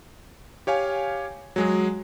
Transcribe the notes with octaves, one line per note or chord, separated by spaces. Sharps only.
G4 C#5 F5 G#5
F#3 G#3 G#4